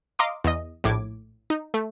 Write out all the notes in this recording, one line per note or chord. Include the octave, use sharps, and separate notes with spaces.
D#5 F5 A#5 C6 D6 D#6
E2 D#5
A#1 A2 D6 G#6
D#4
A3